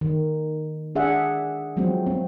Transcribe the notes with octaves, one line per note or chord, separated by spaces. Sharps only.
D#3
D4 G#4 E5 F#5
F3 F#3 G#3 C4
C4